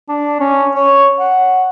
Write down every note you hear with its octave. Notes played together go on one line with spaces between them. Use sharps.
D4
C#4
C#5
F#5